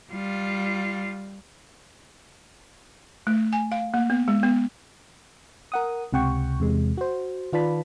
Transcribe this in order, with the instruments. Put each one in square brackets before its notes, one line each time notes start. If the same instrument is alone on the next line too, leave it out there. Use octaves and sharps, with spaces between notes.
[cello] G3 F4
[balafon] A3
G#5
F5
A#3
B3
G#3
B3
[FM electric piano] A#4 F#5 D#6
C#2 C3 F#5 G5 C#6
E2 C3 G#3
F#4 C5
D#3 F4 B4 D5 A5 B5